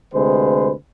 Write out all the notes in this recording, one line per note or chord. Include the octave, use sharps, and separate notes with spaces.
D2 C3 G#3 B4 C5